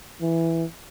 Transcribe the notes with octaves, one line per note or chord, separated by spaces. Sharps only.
E3